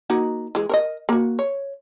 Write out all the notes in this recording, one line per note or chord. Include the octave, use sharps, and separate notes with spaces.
A#3 D#4 F#4
E3 G#3
A#4 C#5 D#5
A#3 F#4
C#5